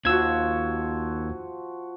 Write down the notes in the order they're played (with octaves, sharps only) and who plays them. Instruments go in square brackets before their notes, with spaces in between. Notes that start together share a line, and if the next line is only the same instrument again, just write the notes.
[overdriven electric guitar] D#2 [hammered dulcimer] F3 F#4 [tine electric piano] E6 G#6